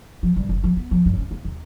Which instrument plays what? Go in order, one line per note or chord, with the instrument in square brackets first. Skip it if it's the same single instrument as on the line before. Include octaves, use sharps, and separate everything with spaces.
[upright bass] F3
G2
F#1
F3
B3
F3
G2
C#4
A#3
D#2